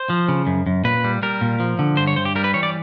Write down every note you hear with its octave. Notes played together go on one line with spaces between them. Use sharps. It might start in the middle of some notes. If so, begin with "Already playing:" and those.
Already playing: C5
F3
C#3
F#2
F#2
A#2 B4
G3
G3 A#4
A#2
F3
D3
G2 C5
C#5
G2 C5
G4
G3 A#4
B4
E3 C#5
D5